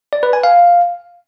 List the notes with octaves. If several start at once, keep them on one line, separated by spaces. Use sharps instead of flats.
D5
B4
G#5
F5